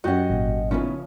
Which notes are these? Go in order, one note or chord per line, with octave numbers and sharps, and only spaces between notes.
F#2 C#4 F#4 G4 D#5 F#5
G#1 A#2
C#3 F3 B3 C#4 D#4 E4